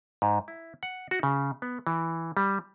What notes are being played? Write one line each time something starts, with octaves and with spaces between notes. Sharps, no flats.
G#2
E4
F#5
F#4
C#3
B3
E3
G3